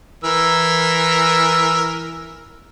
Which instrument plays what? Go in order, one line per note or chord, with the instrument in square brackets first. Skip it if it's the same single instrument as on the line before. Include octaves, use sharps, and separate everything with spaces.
[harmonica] E3 A#4 E6